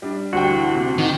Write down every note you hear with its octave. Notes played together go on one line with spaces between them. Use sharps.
G3 D4
D2 G3 F#4 G5
E3
C3
D#3